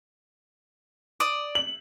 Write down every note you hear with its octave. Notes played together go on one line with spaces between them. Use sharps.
D5 D#6
F#7